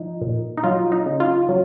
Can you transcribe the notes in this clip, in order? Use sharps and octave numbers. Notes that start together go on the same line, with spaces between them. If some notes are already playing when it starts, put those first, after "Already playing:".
Already playing: F3 D#4
A#2
D#4
F#3 F4
D#4
C#3
F4
F#3